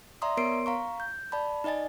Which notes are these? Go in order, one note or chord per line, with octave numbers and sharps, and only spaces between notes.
D5 E5 A#5 C6 D#6
B3 A#4 C#5 C6 C7 D7
F5 A#5 C#6
G6
D5 A5 B5
D#4 D5 D#5 G#5 A6